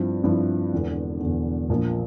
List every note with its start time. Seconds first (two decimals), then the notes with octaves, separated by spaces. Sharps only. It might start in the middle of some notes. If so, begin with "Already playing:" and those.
Already playing: G2 F3 C4 E4
0.24 G2 F3 C4 E4
0.73 E1 E2 D3
1.21 E1 E2 D3
1.69 A#1 A#2 F3 A#3